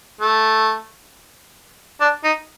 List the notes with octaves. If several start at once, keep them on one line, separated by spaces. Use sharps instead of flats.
A3
D4
D#4